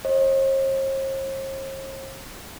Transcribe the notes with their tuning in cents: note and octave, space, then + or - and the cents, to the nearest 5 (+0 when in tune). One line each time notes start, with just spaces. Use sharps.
C5 +45 D#5 +0